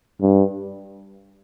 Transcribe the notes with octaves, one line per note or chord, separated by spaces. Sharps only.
G2